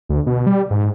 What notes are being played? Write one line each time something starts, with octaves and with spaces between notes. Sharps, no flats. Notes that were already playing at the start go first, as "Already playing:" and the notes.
D2
B2
G3
G#2